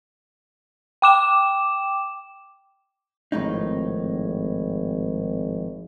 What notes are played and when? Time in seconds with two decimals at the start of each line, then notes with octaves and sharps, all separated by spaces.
1.02 G5 D6 E7
3.32 G#1 F2 A2 D#4